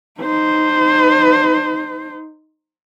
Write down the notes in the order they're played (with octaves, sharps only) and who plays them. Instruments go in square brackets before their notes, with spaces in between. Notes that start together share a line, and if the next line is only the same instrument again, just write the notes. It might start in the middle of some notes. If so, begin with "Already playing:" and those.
[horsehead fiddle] D#4 C5